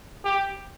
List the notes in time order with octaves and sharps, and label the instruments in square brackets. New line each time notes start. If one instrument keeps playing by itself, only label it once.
[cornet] G4